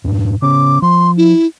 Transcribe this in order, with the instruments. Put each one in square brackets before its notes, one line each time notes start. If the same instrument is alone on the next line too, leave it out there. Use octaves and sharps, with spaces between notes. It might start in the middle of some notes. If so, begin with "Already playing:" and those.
[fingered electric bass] F2 G#2
[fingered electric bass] C#3 B3 C#4 [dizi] D6
[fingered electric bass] F3 [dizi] C6
[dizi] E4